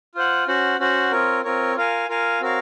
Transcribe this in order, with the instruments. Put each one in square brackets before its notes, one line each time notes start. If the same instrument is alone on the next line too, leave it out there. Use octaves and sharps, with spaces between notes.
[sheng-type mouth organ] F4 C5 F#5
C#4 F#4 C5 F#5
C#4 F#4 C5 F#5
C4 F4 A#4 C#5
C4 F4 A#4 C#5
F4 A#4 F5 G#5
F4 A#4 F5 G#5
C4 F#4 A#4 C#5 F5